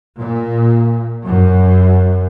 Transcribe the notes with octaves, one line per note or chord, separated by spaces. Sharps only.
A#2
F#2